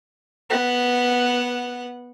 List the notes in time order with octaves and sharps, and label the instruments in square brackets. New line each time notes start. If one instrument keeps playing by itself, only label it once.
[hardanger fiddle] B3 F#5